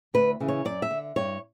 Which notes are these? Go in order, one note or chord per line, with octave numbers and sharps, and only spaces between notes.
D2 B4
C#3 E3
C#5
F#2 D5
E5
D3
G2 C#5